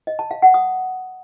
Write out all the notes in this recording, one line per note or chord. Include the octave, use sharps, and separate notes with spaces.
D#5
A5
F5
F#5
D#6